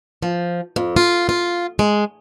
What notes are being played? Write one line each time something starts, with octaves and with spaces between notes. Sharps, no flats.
F3
F2
F4
F4
G#3